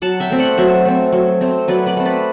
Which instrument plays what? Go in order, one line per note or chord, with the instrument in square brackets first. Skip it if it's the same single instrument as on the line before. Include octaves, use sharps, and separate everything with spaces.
[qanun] F#3 F#5 A5
E5 G5
A3 C4
D5 F#5
F#3 C5 E5
A3 C4
F#3
A3 C4
F#3 B4 D5
B4 D5
A3 C4
B4 D5